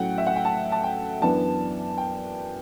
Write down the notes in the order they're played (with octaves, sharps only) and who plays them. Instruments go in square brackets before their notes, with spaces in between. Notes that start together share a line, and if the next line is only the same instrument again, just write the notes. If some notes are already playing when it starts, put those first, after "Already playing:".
Already playing: [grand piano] A2 F#3 A3 C#4 F#5 G5
E5
F#5
G5
A5
A5
G5
F#2 E3 B3 D4 A5
G5